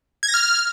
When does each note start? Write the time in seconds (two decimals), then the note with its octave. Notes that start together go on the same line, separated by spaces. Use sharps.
0.23 G#6
0.28 A#6
0.34 F6